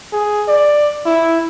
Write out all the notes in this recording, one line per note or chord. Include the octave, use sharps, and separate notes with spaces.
G#4
D5
E4